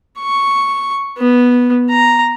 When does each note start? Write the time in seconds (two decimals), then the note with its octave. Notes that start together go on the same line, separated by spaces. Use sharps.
0.19 C#6
1.18 B3
1.90 A#5